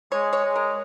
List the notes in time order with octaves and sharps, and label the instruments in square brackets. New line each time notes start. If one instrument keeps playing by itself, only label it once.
[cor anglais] G#3 [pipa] C#5
[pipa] C#5
[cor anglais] G#3
[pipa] A#4